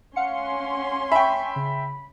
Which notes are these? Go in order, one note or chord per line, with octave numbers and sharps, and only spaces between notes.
C#4 F5 F#5 C6 C#7
E5 G5 G#5 B5 C#6
C#3